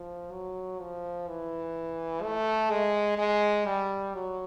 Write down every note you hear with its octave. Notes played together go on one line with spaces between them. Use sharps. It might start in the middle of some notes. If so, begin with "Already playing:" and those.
Already playing: F3
F#3
F3
E3
A3
G#3
G#3
G3
F#3